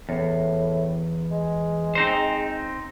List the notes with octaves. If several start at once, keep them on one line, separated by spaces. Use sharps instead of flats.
E2 A2
G#3
C4 D#4 C5